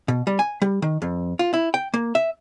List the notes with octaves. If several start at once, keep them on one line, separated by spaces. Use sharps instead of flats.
B2
G3
G#5
G3
D#3
F2
F4
E4
G5
A#3
E5